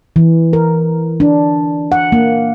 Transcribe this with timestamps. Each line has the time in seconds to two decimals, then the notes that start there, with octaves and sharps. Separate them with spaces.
0.16 E3
0.53 A#4
1.20 D4
1.92 F#5
2.12 A#3